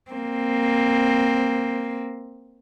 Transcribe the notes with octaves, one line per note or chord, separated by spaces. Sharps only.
A#3 C4